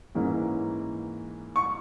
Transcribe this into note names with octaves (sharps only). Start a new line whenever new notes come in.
G#2 E3 A#3 C#4
C#6